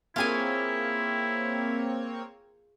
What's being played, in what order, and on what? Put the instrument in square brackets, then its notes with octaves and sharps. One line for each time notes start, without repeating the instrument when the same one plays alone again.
[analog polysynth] A#3 C4 C#5 [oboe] E4 [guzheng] F4 G#4 G#5